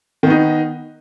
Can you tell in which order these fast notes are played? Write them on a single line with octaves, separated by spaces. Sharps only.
D#3 B3 D#4